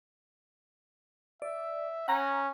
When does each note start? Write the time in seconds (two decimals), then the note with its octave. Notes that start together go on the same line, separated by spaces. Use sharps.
1.42 D5 E5
2.08 C#4 F#5 A#5